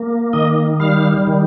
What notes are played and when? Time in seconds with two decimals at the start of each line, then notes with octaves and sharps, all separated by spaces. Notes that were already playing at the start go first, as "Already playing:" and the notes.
Already playing: A#3
0.33 D#3 D#5
0.80 G3 F5
1.27 D#3